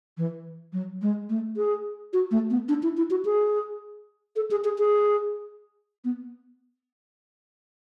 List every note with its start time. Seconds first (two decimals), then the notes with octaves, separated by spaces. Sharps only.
0.18 E3
0.73 F#3
1.02 G#3
1.30 A3
1.57 G#4
2.13 F#4
2.31 A3
2.50 B3
2.69 D4
2.83 E4
2.97 E4
3.10 F#4
3.25 G#4
4.36 A4
4.51 G#4
4.64 G#4
4.78 G#4
6.05 B3